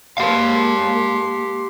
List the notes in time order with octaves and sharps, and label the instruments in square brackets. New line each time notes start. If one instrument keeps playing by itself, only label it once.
[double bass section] G#3 A#3 [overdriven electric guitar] G4 F5 [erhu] C6